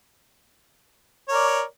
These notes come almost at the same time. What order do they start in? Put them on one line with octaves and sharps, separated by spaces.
C#5 A#4 D5